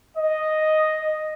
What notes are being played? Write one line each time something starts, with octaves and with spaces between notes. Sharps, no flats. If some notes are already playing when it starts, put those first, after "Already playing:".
D#5